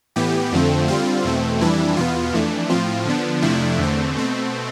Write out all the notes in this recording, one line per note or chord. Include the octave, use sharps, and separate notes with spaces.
A2 E3 B3 G4
F2 D3 F3 A3 C4
D3 G3 C4 F4
E2 B2 A3 C4
F2 E3 G3 D4 E4
E2 B2 B3 F4
F2 E3 A3 D4
A2 F3 C4 F4
D3 F3 B3 D4
F2 C3 F3 A3 D4 E4
E2 D3 A3 C4
B2 A3 C4